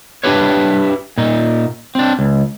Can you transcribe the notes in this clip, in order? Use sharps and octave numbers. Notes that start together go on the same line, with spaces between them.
D4 E4 G4 B4 C#5
A#2 D#4
C4 D4
C#2